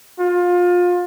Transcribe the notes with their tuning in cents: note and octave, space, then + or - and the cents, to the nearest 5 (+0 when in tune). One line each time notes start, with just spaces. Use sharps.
F4 +25